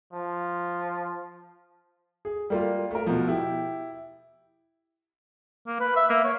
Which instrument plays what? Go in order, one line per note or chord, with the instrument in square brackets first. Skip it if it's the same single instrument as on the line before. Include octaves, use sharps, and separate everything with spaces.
[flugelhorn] F3
[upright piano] G#4
G3 A#3 F4
A3 A#4
B2 F3
E4 G4
[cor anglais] A#3
B4
E5
A#3
C#5